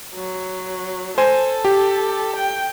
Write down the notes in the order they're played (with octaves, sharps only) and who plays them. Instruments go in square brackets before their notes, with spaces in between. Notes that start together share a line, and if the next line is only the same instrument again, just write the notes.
[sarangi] F#3
[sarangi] A4 [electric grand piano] C5 G#5
[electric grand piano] G4
[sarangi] G5